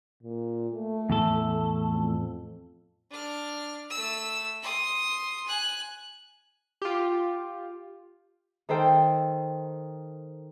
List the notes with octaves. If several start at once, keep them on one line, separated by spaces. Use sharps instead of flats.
A#2
A3
E2 A2 A4
F2
D4 F6
A3 E6
C6 D#6
G#5 F#6
F4 G4
D#3 A4 C5 G5